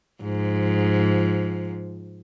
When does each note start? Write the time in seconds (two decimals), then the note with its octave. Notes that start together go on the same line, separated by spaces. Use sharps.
0.23 G#2 F3